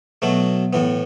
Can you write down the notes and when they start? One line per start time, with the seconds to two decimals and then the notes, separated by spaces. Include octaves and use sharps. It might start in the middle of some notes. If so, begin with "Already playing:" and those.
0.22 B2 F#3 A3 F#4
0.73 A2 E3 B3